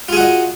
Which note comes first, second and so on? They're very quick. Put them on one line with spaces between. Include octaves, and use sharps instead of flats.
F4 G#4 F#4 D#5